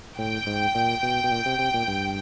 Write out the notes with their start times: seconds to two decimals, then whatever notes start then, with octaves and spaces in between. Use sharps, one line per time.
0.18 A2 G5
0.47 G#2
0.75 A#2
1.02 B2
1.24 B2
1.31 A#2
1.46 C3
1.59 C3
1.74 A#2
1.87 G2